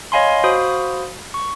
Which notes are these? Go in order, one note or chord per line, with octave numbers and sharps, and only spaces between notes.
C#5 D#5 F5 G#5 B5 C6
F#4 C5 F5 B5 D#6
C#6